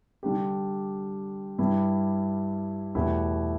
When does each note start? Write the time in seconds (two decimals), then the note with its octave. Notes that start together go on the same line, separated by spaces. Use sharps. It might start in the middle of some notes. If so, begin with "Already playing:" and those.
0.23 D3 G3 D4 G4
1.58 G2 G3 E4 G4
2.95 E2 B2 A3 E4 G4